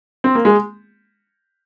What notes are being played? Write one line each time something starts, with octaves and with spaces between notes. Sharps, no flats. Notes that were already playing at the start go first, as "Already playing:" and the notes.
C4
A#3
G#3